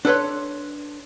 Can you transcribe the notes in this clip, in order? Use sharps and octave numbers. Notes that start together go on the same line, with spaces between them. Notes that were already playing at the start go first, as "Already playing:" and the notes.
D4 A4 B4 C#5 C6